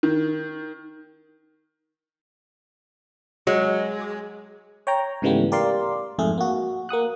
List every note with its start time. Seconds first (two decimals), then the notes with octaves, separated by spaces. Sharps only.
0.03 D#3
3.47 F#3 G#3
4.87 C#5 G5 A#5
5.22 G#2 C#3 E3 G3 A3 B3
5.52 G4 A#4 D5 F5 C6
6.19 F2 G#2 A3 G#4
6.38 A#3 F#4
6.89 A#3 F#5 D#6 F#6